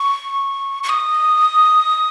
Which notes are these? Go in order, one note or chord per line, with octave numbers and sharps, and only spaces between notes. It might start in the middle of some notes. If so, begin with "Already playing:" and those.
Already playing: C#6
C#6
D#6